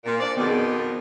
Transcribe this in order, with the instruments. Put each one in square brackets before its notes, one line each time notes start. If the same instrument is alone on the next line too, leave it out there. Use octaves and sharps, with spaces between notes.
[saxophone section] A#2
[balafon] C5 [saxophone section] D5
[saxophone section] F2 B2 D#3 [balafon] B3 G#4